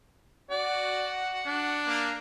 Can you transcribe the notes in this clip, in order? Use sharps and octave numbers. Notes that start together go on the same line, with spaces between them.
F#4 D5 F#5
D4
A#3